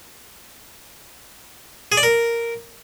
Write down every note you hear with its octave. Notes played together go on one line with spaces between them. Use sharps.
G#4
D5
A#4